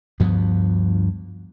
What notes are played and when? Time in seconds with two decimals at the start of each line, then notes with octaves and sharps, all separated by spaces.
0.20 D2 G2 F3 B3